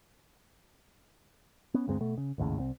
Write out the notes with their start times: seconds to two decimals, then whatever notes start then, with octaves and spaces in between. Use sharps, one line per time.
1.74 B3 C#4
1.88 D2 G2 G#3 C4
2.00 B2 A3
2.18 C#3
2.38 G#1 D#2 A2 C#3
2.58 C2 C4